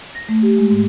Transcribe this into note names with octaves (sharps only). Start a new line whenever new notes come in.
A#6
A3
G4
G#3
G#2